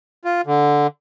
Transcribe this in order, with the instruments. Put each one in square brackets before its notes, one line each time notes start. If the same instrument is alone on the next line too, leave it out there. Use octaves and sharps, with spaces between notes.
[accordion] F4
D3